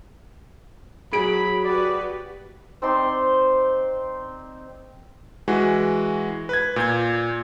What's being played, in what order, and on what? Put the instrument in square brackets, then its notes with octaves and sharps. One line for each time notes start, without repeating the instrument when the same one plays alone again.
[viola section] F#3 [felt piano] G#4 D7 [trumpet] B5
[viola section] F#4 G4 B4 [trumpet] D5
[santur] C4 D#4 D5 C6
[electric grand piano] E3 G#3 F#4
B4 G#6
A#2 G6 G#6